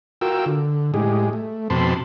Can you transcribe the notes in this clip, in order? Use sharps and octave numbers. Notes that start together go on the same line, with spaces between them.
F4 F#4 A#4 G5 E6
D3
A2 G#3 G4 G#4
A3
F2 B2 C4 A5 B5 C6